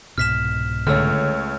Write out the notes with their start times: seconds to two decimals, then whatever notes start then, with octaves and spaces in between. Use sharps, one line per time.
0.18 C2 G#2 B2 F6 B6 E7
0.87 C#2 D3 A3 C#5 E6 F6